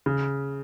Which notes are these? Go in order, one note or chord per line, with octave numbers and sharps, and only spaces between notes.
C#3